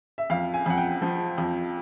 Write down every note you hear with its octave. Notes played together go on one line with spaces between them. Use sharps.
E5
F2 F5
G#5
F2 F#5
G5
F3
F2